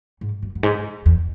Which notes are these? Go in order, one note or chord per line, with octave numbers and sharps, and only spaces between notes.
G#2
F#2
F#2
G#2
E2